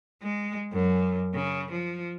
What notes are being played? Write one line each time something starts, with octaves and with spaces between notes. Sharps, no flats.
G#3
F#2
C#3
F3